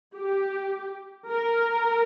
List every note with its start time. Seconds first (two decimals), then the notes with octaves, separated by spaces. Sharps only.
0.16 G4
1.28 A#4